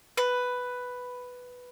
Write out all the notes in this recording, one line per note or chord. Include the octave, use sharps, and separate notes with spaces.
B4